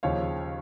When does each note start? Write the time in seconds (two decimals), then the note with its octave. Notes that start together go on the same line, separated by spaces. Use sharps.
0.03 D#2 C#3 F3 C#5 F5